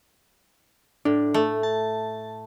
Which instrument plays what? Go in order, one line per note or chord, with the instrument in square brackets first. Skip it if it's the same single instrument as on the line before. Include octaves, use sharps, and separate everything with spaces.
[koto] A2 [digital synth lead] D4
[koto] A3
[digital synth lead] A5